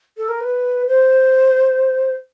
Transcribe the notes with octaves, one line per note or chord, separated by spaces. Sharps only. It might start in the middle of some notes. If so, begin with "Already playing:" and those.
A4
A#4
B4
C5